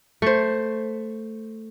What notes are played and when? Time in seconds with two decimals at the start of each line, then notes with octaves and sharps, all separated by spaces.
0.22 A3 C5